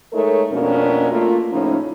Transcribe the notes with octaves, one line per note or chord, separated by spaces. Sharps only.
G#3 A3 D#4 A4 A#4 C#5
F2 B2 A#3 C#4 D4 A#4
A3 A#3 F4
A2 C#3 F3 C#4 D#4